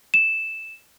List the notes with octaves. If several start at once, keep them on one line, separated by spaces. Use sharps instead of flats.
E7